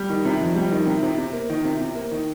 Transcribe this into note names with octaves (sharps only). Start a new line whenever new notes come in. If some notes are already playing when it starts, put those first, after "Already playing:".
Already playing: G3
D#3
C3
F2
G3
D#3
C3
C3
C3
A#3
D#3
C3
C3
A#3
D#3